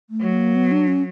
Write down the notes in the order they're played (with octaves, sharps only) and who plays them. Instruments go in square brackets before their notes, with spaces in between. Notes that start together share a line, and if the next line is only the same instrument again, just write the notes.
[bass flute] A3
[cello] F#3
[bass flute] A#3
B3
D4
C#4